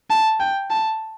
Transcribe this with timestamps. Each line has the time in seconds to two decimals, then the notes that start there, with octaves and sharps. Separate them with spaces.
0.10 A5
0.40 G5
0.70 A5